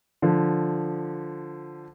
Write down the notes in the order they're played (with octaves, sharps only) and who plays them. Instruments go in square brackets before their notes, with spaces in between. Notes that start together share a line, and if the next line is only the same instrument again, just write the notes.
[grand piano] D3 F3